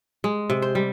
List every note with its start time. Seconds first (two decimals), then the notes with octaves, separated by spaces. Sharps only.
0.24 G#3
0.50 C3
0.62 C5
0.75 G3